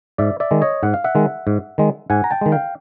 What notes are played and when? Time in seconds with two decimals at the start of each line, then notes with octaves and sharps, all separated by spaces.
0.18 G#2 D5 E5
0.40 D5 E5
0.51 D#3 G#3
0.62 C#5 D#5
0.83 G#2 F#5
0.94 F5
1.04 E5 F#5
1.15 D#3 G#3
1.47 G#2
1.78 D#3 G#3
2.10 G#2 F#5 G#5
2.24 A#5
2.31 G5 A5
2.41 D#3 G#3
2.52 F5 G5